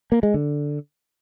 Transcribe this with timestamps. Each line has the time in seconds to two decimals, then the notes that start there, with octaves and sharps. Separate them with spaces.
0.12 A#3
0.23 G#3
0.34 D3